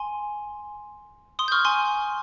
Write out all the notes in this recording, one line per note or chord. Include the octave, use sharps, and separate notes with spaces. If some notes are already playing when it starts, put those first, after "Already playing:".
Already playing: G#5 C6
C6 D#6
G6
C#6 F6
G#5 C6